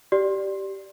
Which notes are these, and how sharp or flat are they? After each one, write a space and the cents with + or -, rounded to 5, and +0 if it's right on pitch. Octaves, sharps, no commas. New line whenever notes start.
G4 -15 D5 +0